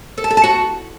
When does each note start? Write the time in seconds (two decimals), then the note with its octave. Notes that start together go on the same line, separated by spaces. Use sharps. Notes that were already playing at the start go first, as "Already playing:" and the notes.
0.18 A4
0.24 A5
0.31 A4
0.37 A5
0.44 F#4